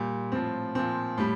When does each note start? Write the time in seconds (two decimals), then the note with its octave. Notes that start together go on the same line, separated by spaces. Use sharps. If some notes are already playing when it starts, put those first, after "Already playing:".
Already playing: A#2 G3
0.32 A2 F3 C4
0.75 A#2 F3 C4
1.18 A2 G3